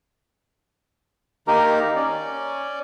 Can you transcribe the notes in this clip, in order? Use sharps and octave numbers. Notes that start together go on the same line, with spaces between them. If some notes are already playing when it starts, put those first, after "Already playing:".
D#3 A#3 D#4 G4 A#4 A#5
C#4 D5